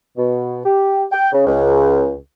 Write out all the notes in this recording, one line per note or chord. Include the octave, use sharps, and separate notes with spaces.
B2
G4
G5
C#3
C#2